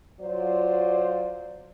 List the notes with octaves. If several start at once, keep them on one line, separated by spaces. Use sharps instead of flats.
F#3 F4 C5 D5